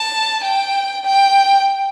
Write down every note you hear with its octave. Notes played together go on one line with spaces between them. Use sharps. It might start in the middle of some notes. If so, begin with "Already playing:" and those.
Already playing: A5
G5
G5